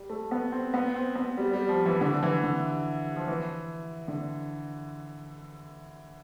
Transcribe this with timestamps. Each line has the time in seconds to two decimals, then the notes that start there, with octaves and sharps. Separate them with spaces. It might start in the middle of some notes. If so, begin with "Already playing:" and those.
Already playing: G3
0.09 A3
0.31 B3
0.52 C4
0.74 B3
0.96 C4
1.16 B3
1.37 G3
1.53 G3
1.69 F3
1.86 E3
2.01 D3
2.23 E3
2.44 D3
3.16 F3
3.28 E3
4.08 D3